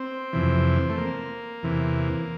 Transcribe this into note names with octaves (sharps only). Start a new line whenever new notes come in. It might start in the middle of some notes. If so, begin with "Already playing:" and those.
Already playing: C4
F2 C3 E3
A3
A#3
E2 C3 E3